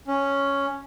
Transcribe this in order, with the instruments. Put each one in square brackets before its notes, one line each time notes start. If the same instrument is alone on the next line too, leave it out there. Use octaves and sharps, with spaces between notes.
[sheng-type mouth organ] C#4